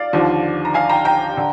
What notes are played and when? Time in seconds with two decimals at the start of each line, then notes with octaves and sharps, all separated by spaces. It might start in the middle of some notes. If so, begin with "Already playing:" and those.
Already playing: D5 F5
0.13 D#2 D3 F3
0.65 A#5
0.74 F5 G#5
0.89 G5 A#5
1.05 G5 A#5
1.37 D3